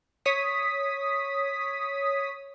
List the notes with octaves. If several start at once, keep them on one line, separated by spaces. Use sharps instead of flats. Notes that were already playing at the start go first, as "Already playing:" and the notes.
C#5 D#6 B6